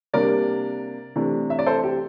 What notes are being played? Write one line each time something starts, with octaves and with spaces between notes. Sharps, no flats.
C3 G3 A#3 D4 A#4 D5
C3 E3 A3 D4
E5
D5
A4 C5
G4